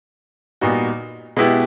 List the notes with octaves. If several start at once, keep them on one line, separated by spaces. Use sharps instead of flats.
A#2 G3 B3 D#4 F#4
B2 G#3 B3 E4 G4